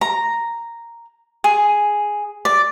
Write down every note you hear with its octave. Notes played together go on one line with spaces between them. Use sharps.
A#5
G#4
D5